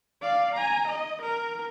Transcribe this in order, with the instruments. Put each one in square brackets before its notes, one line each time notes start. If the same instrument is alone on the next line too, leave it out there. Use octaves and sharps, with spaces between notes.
[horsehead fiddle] D5 F5
G#5 A#5
D#5
A#4